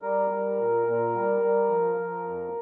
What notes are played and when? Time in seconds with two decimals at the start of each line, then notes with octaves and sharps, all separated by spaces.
0.02 G3 A#4
0.30 G3
0.58 A#2
0.87 A#2
1.15 G3
1.41 G3
1.70 F3
1.98 F3
2.26 F2